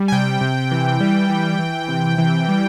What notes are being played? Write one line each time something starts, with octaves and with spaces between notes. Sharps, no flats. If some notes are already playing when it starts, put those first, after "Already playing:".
Already playing: G3
G#5
C3 G5
C3
E3
G3
E3
E3
C3
E3
G3